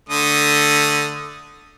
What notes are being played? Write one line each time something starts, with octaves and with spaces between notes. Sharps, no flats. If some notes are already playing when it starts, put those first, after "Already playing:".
D3 A3 D#6